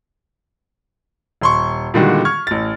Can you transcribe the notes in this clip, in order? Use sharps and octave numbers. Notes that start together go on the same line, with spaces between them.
D#1 C6 C#6
A#2 D3 D#3 G3 G#3 F#4
C#6 F6 G#6
A1 A6